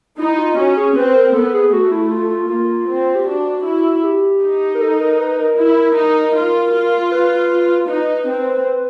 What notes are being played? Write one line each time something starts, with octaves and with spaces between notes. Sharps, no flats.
D#4 E4
F4
C#4 F#4
G#4
C4 B4
A#4
B3 A4
G#4
A3 F#4
E4
F4
F4
A#3 F4
C4
G4
D4 F#4
E4
G4
D#4
A#4
A4
A#4
B4
A#4
E4
D#4
F4
F4
B4
D#4 B4
C4